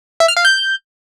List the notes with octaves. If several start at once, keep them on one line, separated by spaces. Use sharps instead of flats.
E5
F6
F5
G6